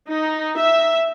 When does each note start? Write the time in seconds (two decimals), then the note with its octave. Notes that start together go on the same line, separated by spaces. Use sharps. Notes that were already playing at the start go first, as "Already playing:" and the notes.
0.10 D#4
0.58 E5